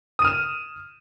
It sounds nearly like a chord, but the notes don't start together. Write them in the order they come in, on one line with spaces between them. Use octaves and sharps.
D#6 D#7 F6 E7